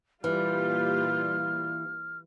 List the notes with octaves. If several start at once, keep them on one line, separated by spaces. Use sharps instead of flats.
A#2 E3 G3 F4 F6